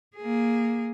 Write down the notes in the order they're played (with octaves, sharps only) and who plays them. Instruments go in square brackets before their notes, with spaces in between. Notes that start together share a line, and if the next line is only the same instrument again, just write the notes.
[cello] A#3 G#4